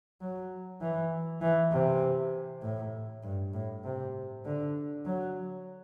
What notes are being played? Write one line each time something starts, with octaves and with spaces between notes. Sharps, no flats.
F#3
E3
E3
C3
A2
G2
A2
C3
D3
F#3